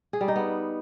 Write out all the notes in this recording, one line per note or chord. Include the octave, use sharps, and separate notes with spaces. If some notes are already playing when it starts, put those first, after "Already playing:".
G#4
G3
D#4
B3